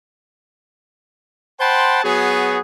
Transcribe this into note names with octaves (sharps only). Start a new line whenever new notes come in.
C5 F#5 G5 A5 B5 C6
F#3 B3 F#4 G#4